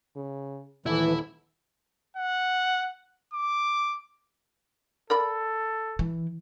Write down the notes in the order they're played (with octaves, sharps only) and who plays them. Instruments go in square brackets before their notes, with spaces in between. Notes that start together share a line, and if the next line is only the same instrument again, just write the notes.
[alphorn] C#3
[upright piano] D#1 [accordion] E3 [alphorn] A3 [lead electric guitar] E4
[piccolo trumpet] F#5
D6
[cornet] A4 [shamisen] A#4 D5 B5
[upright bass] E3